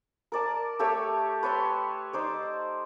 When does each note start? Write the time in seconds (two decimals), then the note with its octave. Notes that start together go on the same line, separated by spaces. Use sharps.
0.32 A#4 D5 A5
0.79 A3 G4 A4 C#5
1.43 B4 C#5 A5 C6
2.13 D#4 C5 D5